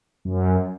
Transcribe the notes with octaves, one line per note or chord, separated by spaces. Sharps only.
F#2